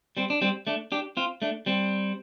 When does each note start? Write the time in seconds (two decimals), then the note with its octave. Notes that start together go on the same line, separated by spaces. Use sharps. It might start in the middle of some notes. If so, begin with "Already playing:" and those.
0.17 G3 C4
0.30 D4
0.42 G3 C4
0.67 A3 D4
0.92 D4 G4
1.17 C4 F4
1.42 A3 D4
1.66 G3 C4